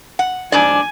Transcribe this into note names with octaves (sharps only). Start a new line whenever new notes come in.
F#5
G#2 D4 D5 G#5